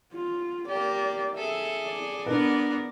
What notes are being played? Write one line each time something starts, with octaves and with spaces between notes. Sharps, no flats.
F4
A#3 G4 D5
G#4 A4 E5
D5
B3 D4 A#4 B4